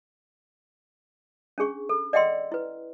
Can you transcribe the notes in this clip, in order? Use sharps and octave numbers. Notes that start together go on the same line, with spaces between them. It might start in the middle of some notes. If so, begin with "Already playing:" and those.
C#4 D4 G#4 C#6
A4
D5 D#5 F#5 G5 C6 E6
E4 B4